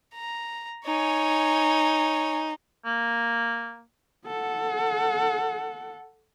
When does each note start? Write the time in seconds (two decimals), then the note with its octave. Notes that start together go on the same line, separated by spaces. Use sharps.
0.15 A#5
0.86 D#4 C#5 G#5
2.86 A#3
4.27 A4 F#5